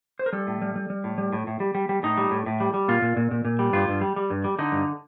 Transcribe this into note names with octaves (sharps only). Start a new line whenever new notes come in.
C5
A#4
G3 A4
A2
G3
G3
G3
A2
G3
A2
A2
G3
G3
G3
A2 D#4
G3
A2
A2
G3
G3
A#2 F4
A#2
A#2
A#2
A#2
G3
G2 F4
G2
G3
G3
G2
G3
D3 D#4
G2